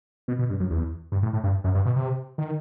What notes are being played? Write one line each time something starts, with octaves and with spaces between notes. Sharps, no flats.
B2
B2
G2
F#2
E2
G2
A2
A2
G2
F#2
G2
B2
C3
D#3